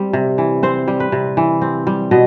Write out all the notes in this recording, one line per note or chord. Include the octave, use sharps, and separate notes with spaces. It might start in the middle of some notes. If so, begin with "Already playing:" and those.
Already playing: G3 C4
C3
E3
C4 C5
G3
B4
C3
E3
C4
G3
B2 D#5